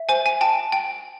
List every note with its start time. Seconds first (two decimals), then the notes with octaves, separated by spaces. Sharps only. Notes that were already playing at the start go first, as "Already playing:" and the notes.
Already playing: E5
0.09 C5 G#5
0.26 G#5
0.41 G5 A5
0.72 G5